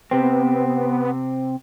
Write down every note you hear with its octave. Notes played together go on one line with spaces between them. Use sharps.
C3 B3 C4